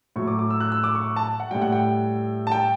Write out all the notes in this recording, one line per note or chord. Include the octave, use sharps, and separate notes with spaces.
A2 F#3 C#6
D6
D6
E6
F#6
E6
D6
C#6
A5
F#5
A2 G3 G5
F#5
G5
A5
G5